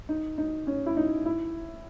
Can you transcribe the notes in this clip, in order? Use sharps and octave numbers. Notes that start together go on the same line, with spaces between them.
D#4
D#4
C#4
E4
D#4
E4